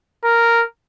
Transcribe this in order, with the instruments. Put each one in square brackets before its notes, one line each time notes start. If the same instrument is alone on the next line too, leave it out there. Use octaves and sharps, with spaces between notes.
[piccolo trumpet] A#4